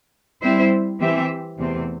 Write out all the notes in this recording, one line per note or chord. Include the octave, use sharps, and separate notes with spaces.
G3 C4 E4 C5 E5
E3 C4 G4 E5
E2 C3 A3 C4